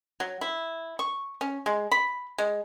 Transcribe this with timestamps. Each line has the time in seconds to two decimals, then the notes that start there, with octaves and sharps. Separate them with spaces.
0.20 F#3
0.41 E4
0.99 C#6
1.41 C#4
1.66 G#3
1.91 B5
2.38 G#3